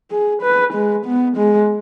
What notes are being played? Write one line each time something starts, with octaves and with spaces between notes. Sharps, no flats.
G#4
B4
G#3
B3
G#3